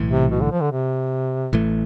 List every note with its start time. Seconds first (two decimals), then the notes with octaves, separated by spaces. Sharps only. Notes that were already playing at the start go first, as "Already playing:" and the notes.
Already playing: B1 A2 E3
0.11 C3
0.31 B2
0.41 D3
0.51 F3
0.61 D3
0.72 C3
1.53 A1 A2 E3 A3